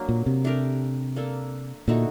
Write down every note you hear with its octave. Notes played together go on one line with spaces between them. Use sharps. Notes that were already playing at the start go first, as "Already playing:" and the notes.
Already playing: F#3 A#3 D4
A#2
C3
A3 D4 G4 A#4
A#3 D4 A4
A#2 D3 A3 D#4 F#4